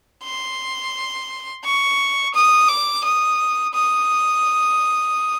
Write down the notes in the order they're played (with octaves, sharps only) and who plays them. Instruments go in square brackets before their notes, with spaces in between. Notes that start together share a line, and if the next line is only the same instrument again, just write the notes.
[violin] C6
C#6
D#6
D6
D#6
D#6